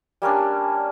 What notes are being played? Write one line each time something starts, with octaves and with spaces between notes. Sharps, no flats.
G3 A#3 C#4 D4